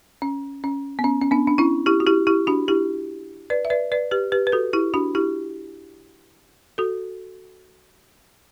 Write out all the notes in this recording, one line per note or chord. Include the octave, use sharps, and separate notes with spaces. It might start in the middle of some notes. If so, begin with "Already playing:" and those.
C#4
C#4
B3
C#4
C#4
B3 D4
D4
C#4 E4
E4 G4
F#4
E4 G4
E4 G4
D4 F#4
E4 G4
B4 D5
E5
B4 D5
B4 D5
G4 B4
G4 B4
B4
F#4 A4
E4 G4
D4 F#4
E4 G4
F#4 A4